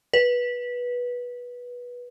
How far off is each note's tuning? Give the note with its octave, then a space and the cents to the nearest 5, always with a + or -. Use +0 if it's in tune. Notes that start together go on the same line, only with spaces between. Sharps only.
B4 -15